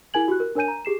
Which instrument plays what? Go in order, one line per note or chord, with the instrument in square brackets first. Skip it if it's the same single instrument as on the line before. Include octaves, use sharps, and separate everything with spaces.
[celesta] E4 G#4 A#4 G#5 G#6 F#7
F#4 G4 F#6
A#4
D4 A#4 C#5 G#5 G6 D#7
A#5
G4 G#4 C7 E7